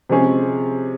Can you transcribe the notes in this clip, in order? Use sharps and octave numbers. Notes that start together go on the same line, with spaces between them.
C3 F3 G#3 C#4 G#4